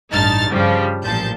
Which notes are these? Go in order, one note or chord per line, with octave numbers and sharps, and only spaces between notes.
A1 G2 D#4 A5 F6 A6
G2 C#3 F3 G3
A1 A#2 F3 A5 G6